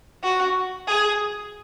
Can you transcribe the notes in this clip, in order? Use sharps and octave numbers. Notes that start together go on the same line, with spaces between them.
F#4
G#4